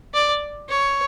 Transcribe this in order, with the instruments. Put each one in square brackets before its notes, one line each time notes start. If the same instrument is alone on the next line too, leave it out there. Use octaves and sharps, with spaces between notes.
[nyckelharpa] D5
C#5